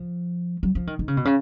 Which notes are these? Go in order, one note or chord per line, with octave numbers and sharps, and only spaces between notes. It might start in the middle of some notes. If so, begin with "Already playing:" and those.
Already playing: F3
F#3
F3
D#3
D#3
C#3
B2
C#3